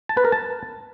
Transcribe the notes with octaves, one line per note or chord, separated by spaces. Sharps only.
A5
B4
A#4
A5